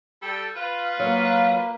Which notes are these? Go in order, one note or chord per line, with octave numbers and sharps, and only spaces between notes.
G3 A4 G5
F4 B4
F#3 A#3